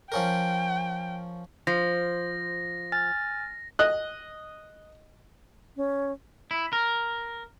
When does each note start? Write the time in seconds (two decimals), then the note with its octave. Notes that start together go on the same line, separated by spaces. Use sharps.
0.12 F3 C#4 A#4 G5
1.67 F3 C5 A#6
2.92 G#5 F6 A6
3.79 D#5 F#6
5.77 C#4
6.51 E4
6.73 A#4